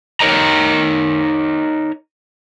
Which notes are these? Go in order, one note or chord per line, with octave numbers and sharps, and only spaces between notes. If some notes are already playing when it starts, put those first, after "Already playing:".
D#4 A#4 C#5 D#5 A#5